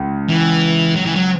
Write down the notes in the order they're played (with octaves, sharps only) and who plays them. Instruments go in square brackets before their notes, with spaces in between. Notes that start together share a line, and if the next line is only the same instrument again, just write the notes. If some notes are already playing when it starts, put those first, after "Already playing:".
Already playing: [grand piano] C#2
[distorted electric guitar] E3
F#3
E3
F#3